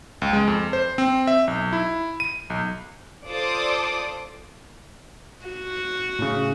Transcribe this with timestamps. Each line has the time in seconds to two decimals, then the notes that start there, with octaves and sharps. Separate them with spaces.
0.22 C#2
0.33 G#3
0.48 F2
0.73 C5
0.98 C4
1.27 E5
1.48 B1
1.73 E4
2.20 D#7
2.50 B1
3.28 F4 A4 C5 D5 D6 D#6
5.46 F#4
6.19 A2 C#3